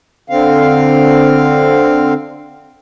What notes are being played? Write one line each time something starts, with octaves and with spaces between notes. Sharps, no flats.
D3 C4 F5